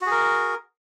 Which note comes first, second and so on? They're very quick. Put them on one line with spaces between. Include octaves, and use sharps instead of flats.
F#4 G#4 A#4